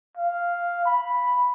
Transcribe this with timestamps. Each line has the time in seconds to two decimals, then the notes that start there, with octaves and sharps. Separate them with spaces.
0.17 F5
0.85 B5